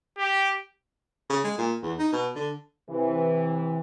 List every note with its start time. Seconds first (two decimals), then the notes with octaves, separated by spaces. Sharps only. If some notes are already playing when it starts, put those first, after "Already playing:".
0.18 G4
1.30 C#3
1.44 G#3
1.58 A#2
1.83 E2
1.99 D#4
2.13 B2
2.35 D3
2.90 C3 E3